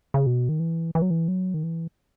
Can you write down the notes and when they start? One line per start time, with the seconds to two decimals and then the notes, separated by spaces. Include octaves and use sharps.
0.14 C#3
0.26 B2
0.49 D#3
0.60 E3
0.95 E3
1.02 F#3
1.10 E3
1.28 F#3
1.54 D#3
1.63 E3